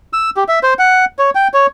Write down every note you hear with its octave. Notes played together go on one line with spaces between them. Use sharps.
E6
G4
E5
C5
F#5
C#5
G5
C#5